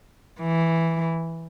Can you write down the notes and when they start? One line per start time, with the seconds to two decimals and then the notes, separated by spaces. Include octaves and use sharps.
0.41 E3